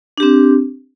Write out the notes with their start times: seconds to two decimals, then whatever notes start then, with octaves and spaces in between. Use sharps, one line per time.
0.18 D4
0.20 G4
0.23 C4